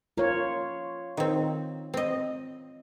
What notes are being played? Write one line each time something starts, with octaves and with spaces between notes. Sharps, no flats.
A#3 F4 C#5
D#3 C4
C4 D#5